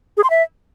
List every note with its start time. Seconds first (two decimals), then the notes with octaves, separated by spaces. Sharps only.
0.17 G#4
0.24 C6
0.30 E5